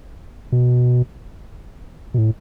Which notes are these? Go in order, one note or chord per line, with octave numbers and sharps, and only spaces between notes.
B2
B2
A2